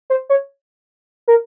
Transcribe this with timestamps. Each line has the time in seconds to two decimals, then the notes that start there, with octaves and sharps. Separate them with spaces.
0.10 C5
0.30 C#5
1.28 A#4